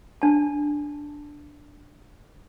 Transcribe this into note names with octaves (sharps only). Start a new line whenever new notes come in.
D4 A5